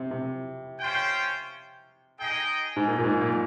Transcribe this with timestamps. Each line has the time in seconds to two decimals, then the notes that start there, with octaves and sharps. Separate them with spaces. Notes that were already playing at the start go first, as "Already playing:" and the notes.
Already playing: C3
0.11 C3
0.80 C#4 F4 C5 G5
2.18 D#4 G#4 D#5 G5
2.76 G#2
2.88 A#2
2.98 A#2
3.04 G#2
3.21 A#2